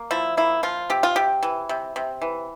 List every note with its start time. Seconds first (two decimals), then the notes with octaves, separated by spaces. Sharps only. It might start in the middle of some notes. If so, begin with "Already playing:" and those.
Already playing: A#3
0.11 F3 E4
0.37 A#3 E4
0.63 F3 F4
0.90 C3 G4
1.03 F4
1.16 C3 G4
1.43 E3
1.69 C3
1.96 C3
2.22 E3